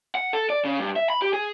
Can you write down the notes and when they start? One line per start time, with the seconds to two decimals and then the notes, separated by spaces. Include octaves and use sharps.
0.15 F#5
0.33 A4
0.50 D5
0.64 C#3
0.80 G2
0.96 E5
1.10 B5
1.22 G4
1.33 G#4